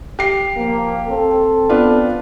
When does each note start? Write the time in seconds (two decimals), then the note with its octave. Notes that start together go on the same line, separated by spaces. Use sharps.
0.19 G4 C7
0.57 F3 A#3
1.08 C4 A4
1.69 B3 D4 F4